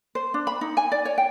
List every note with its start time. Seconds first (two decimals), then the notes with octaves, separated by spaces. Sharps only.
0.15 C5
0.34 D4
0.47 B5
0.61 D#4
0.77 G#5
0.92 D5
1.05 C#5
1.18 G5